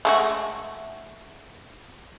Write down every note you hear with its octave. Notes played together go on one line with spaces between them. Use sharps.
G#3 A3 F#4